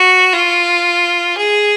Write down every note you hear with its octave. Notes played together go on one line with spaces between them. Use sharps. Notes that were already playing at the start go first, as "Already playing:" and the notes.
Already playing: F#4
F4
G#4